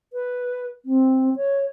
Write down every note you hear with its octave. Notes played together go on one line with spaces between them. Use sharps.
B4
C4
C#5